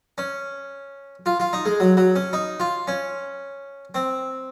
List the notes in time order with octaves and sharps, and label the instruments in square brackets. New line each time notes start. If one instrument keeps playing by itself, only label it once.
[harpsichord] C#4
F4
F4
D#4
G#3
F#3
F#3
C#4
D#4
F4
C#4
C4